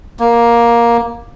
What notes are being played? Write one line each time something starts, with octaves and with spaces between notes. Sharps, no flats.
A#3